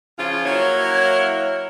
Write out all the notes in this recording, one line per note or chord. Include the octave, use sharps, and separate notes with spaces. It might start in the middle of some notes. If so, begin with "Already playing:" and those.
C#3 F3 F4
F#3 A#3 E4 C#5